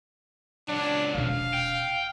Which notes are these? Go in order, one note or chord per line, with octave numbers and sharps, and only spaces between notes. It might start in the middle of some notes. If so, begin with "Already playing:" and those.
C#2 F#3 D4
E1 C3 F5
G5